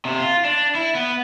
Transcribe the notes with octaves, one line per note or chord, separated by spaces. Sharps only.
C3
F4
D4
E4
B3